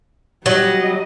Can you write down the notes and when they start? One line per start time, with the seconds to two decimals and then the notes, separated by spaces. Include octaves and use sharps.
0.46 F#3 G3 D#5